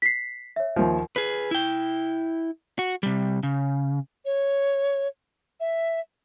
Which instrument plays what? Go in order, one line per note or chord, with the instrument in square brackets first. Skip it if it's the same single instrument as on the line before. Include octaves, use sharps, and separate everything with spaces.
[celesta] B6 C7
C#5 E5
[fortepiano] D#2 F3
[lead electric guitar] G#4 B4
E4 G5
F#4
C3 G3
C#3
[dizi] C#5
E5